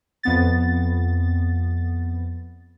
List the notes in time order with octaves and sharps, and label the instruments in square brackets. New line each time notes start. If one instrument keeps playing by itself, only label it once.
[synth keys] F2 B3 A6